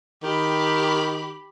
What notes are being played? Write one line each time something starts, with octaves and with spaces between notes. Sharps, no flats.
D#3 G4 B5